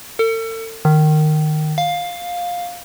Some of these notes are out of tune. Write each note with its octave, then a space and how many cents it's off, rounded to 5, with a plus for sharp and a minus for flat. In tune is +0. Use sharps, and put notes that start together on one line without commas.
A4 +40
D#3 -20
F5 +10